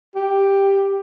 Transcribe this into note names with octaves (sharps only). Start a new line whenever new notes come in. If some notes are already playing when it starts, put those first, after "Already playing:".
G4